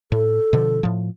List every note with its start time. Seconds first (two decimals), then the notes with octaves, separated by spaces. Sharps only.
0.12 A2 A4
0.53 B2 D3 F3
0.83 A2 F3